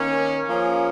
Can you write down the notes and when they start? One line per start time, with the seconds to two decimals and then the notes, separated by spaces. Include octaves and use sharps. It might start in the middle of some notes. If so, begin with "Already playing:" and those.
Already playing: D#3 A#3 C#4
0.49 F3 A#3 C#4 G#4